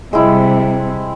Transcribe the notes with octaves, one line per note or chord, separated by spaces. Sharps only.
C3 G3 G#3 C4 E4